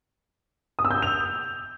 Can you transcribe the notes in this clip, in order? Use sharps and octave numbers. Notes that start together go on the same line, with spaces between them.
D#6
E6
G6
E6
F7